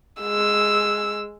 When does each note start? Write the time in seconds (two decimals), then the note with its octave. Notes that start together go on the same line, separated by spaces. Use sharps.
0.22 G#3 E6